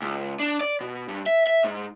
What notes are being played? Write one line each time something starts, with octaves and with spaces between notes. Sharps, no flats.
C#2
D4
D5
B2
G2
E5
E5
G#2